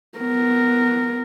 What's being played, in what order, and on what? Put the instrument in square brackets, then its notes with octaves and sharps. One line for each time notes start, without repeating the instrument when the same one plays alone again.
[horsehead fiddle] B3 A#4